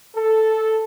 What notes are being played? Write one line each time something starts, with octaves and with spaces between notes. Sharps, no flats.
A4